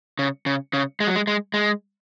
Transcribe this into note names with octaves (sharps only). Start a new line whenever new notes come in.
C#3
C#3
C#3
G#3
F#3
G#3
G#3
G#3